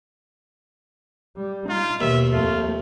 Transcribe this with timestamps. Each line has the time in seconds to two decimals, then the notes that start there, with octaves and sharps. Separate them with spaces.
1.37 G3
1.69 D#4 F4
2.01 D#2 B2 E5
2.32 F2 A3 F4